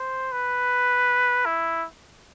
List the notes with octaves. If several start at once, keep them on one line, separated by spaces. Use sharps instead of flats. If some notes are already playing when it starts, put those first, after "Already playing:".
Already playing: C5
B4
E4